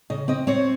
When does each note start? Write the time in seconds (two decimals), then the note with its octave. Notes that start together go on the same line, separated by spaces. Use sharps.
0.10 C#3 D#5
0.28 C4 D#5
0.47 C4 C#5